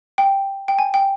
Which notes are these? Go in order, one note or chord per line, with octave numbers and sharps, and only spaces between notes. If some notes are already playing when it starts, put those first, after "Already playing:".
G5
G5
G#5
G5